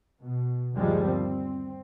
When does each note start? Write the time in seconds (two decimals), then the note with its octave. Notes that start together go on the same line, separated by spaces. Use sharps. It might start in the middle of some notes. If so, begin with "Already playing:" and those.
0.23 B2
0.75 G1 D#2 F3 G3 G#3
1.06 C4